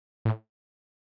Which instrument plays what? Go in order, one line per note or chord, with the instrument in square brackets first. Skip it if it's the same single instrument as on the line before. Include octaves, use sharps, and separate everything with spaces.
[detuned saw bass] A2